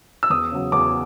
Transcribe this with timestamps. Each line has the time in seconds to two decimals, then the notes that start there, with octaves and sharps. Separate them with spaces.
0.23 E6
0.30 E2 D#6
0.52 C#3 F#3
0.72 E2 D6